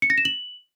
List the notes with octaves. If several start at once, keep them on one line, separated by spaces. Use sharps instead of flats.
C#7
A#6
E7
F#7